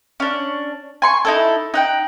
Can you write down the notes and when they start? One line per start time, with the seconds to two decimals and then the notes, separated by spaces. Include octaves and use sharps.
0.20 C#4 D4
1.02 G#5 C6 C#6
1.25 D#4 E4 A4
1.74 D#4 F#5 G5